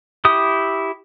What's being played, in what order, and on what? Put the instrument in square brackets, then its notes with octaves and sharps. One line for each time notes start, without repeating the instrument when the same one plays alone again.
[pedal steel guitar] E4 G4 D#6